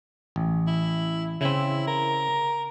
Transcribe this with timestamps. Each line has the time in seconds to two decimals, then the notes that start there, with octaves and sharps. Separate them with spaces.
0.36 A1
0.67 E4
1.41 C#3 C4 E4
1.87 A#4